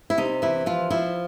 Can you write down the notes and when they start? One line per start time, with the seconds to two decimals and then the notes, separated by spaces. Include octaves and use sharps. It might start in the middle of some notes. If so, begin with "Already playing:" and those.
0.10 E4
0.18 C3 D#4
0.42 E3 E4
0.66 F3 F4
0.90 F3 E4